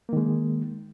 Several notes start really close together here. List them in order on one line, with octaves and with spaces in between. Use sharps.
A#3 D#3 G#3